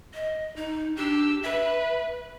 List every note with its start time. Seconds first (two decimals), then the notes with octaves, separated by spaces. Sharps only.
0.14 D#5
0.56 D#4
0.97 D4 G4 E6
1.43 B4 E5